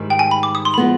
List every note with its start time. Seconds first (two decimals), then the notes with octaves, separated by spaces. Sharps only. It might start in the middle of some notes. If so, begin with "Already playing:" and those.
Already playing: G#2 D#3 G3
0.10 G5
0.19 G#5
0.31 B5
0.43 D6
0.55 D#6
0.65 C6
0.74 B5
0.78 F3 G#3 B3